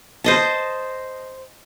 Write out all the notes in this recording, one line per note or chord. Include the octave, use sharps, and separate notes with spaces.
C5 D#5 A5